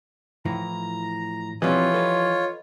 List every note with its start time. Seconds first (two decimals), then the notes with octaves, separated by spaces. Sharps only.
0.45 A2 E3 F3 A#5
1.62 B1 E3 F3 G3 C4 F4 C#5 D#5
1.94 A4 B4 D#5